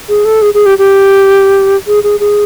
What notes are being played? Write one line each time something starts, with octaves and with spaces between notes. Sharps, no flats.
G#4
A4
G#4
G#4
G4
G4
G#4
G#4
G#4